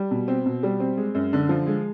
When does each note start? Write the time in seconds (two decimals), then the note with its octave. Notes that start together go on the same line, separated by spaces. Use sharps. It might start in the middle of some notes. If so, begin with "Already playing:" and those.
Already playing: G3
0.11 B2
0.28 C4
0.46 B2
0.63 G3
0.80 C4
0.97 G#3
1.15 F#2
1.33 D3
1.49 F3
1.66 G#3